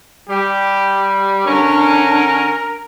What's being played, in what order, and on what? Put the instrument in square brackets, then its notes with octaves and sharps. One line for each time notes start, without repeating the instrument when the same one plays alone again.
[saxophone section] G3 [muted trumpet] G4
[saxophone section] D3 C#4 [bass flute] D4 [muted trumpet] A#4